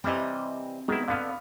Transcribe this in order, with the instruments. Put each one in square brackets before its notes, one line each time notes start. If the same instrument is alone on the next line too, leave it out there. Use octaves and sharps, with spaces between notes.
[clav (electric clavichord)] C3 E3 G3 [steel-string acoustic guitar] C4 D#5
[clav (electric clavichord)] D#3 E4 [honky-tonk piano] G#3 B3
[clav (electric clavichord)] D3 B3 [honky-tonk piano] F5 B5 F6